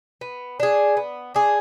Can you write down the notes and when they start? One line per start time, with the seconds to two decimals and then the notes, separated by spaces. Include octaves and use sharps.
0.21 B3
0.60 D4 G#4
0.97 B3
1.34 D4 G#4